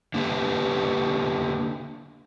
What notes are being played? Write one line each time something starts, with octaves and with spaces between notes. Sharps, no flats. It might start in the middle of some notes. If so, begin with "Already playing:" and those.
D3 A#3 B3 G4 B4